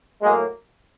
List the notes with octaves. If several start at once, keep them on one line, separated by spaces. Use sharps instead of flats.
A2 F#3 G#3 A#3 G#4